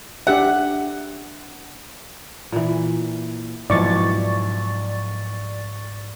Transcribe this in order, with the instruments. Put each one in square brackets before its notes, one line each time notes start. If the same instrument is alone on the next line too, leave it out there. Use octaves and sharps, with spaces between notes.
[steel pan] D4 G4 E5 [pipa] F#5
[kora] A#2 E3
[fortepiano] B1 E4 [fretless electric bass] G#2 F3 [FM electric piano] D5 C#6 A6